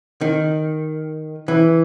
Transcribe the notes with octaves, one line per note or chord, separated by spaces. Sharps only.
D#3
E3